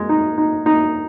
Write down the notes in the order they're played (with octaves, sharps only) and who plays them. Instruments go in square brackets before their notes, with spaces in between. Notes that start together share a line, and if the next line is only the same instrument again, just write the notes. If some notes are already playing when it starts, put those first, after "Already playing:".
Already playing: [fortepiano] G#3
D#4
D#4
D#4